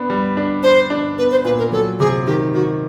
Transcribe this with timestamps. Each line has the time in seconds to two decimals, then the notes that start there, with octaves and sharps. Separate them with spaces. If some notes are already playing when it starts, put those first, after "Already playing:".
Already playing: B3 D4
0.10 G3
0.37 D4
0.63 D4 C5
0.90 D4
1.18 B3 B4
1.31 C5
1.44 A#2 B4
1.58 A#4
1.72 F#3 A4
2.00 C3 G#4
2.26 D#3 G4
2.54 D#3 F#4